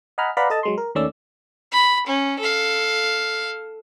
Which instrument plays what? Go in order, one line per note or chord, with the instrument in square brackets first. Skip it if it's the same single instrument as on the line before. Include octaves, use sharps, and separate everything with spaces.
[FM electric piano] D#5 F#5 G#5 A#5 B5 F6
B4 D5 F5 F#5 A#5 B5
A4 D#5 A5
F#3 G#3 C6
A#4
D#2 D#3 A3 C#4 D5 E6
[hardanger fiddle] B5
C#4
A4 F5